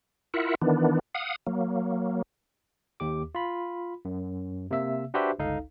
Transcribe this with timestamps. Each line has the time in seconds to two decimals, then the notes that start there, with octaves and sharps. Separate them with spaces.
0.34 E4 F4 A#4 E5 F#5
0.62 D#3 E3 B3 D4
1.15 F5 F#5 D#6
1.47 F#3 A#3
3.00 D#2 G4 D6
3.35 F4 B5
4.05 F#2
4.71 C3 A#3 E5 E6
5.14 D4 F#4 G4 B4 C5 E5
5.39 G1 C#2 D#4 A4 F5